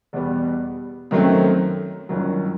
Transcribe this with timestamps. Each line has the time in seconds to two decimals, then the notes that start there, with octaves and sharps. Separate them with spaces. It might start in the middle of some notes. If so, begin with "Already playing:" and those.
0.13 E2 B2 G3 B3
1.11 F#2 D#3 F#3 A3 C4
2.09 G1 F#2 D#3 F#3